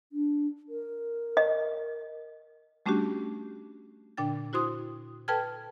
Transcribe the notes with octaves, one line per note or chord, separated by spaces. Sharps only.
D4
A#4
D#5
G3 A3 C#4 D4 F#4 G4
A#2 D3 D4 G5 A6
E4 F#4 C5 C6 D#6
A4 B4 G5 A5 F6 G#6